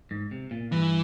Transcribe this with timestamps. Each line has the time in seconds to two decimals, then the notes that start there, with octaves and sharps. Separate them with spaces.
0.11 G#2
0.31 C3
0.51 A#2
0.72 G2 E3